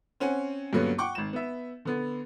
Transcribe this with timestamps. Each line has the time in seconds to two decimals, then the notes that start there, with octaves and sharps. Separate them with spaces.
0.20 C4 C#4 F#5 G#5
0.73 G2 D3 F#3 A#3 B3 C#4
0.98 F#5 G5 C#6 D6
1.15 G#1 E7
1.33 B3 E5
1.85 D3 B3